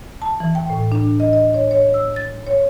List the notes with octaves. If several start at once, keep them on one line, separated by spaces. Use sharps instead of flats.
A5
E3
G5
A2
D4
D#5
D#5
C#5
C#5
E6
A6
C#5